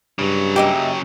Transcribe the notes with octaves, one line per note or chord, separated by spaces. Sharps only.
G2 C#3 F#3
A#3 G4 D#5 E5